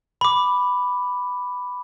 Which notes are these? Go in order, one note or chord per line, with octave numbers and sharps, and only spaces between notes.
B5 D6